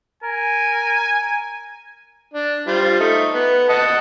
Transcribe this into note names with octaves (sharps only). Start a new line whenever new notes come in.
A#4 G#5
D4
G3 F4 C5
A3 D#4
B3
D#5 F#5 A5